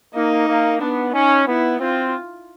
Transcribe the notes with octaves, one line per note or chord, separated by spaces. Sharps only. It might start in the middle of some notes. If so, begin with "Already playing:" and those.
A#3 D#4
A#3
B3 D4
C#4 D#4
B3 E4
C4 F4